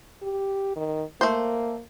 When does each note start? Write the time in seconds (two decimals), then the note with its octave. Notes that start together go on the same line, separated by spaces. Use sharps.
0.23 G4
0.76 D#3
1.21 A3 A#3 C5